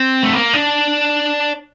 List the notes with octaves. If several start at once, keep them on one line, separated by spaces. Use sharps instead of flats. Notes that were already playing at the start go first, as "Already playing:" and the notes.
Already playing: C4
A3
A#3
D4